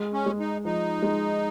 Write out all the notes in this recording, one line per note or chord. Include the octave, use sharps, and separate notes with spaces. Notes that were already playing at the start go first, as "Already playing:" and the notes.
Already playing: G#3
C#4
G#3
D#4
F3 D#4
G#3